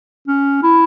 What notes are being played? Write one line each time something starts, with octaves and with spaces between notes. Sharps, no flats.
C#4
E4